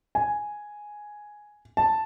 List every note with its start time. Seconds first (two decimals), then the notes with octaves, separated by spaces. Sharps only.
0.15 G#5
1.77 A5